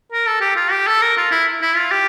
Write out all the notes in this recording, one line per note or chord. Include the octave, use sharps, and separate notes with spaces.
A#4
A4
G4
F4
G4
A4
A#4
F4
E4
E4
F4
G4